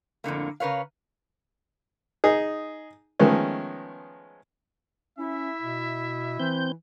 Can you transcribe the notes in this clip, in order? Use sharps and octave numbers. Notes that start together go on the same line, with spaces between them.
F2 A2 D3 A#3
C#3 A#4 B4 C#5 F5
D#4 G#4
D#3 F3 G#3 A3 B3 C#4
C#4 E4 E5
B2
E3 C4 G6